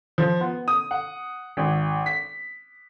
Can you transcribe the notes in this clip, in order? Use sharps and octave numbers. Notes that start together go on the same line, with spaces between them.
F3
B3
D#6
F#5
G#1
B6